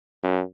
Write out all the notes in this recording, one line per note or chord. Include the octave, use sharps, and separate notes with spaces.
F#2